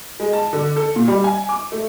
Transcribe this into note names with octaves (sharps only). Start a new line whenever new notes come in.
G#3
A5
D3
A4
A#2
G3
G#5
D6
A3